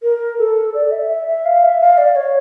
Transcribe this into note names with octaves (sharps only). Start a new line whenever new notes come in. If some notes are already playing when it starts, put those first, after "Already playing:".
A#4
A4
D5
E5
E5
E5
F5
E5
F5
D5
C#5